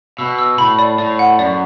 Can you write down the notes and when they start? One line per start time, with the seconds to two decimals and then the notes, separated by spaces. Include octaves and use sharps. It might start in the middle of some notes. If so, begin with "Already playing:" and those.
0.18 B2 E6
0.39 E6
0.58 A2 B5
0.79 D5
0.98 A2 D5
1.19 F#5
1.39 F#2 D5